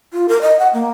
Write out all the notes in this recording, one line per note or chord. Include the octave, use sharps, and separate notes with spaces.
F4
A#4
D#5
F#5
A#3